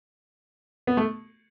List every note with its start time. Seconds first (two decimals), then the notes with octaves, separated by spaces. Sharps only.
0.87 B3
0.97 A3